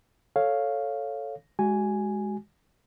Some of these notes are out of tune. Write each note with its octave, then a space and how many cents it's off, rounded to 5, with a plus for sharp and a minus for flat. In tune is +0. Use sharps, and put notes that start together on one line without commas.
A4 +0 C#5 +0 F5 +0
G#3 +0 F#4 +25 G#5 +0